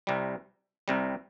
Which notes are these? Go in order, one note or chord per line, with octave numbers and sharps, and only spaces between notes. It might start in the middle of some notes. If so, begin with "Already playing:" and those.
C2 C3 G3
C2 C3 G3